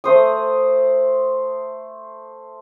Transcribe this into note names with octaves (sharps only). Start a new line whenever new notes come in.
A3 C5 D#6